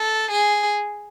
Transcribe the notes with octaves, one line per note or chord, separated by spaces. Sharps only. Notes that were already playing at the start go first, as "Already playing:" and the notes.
Already playing: A4
G#4